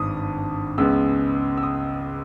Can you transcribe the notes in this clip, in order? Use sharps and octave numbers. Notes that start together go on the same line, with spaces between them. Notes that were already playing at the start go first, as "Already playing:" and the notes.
Already playing: G#1 G2 D#6
C#2 C#3 G#3 B3 E6
E6
D#6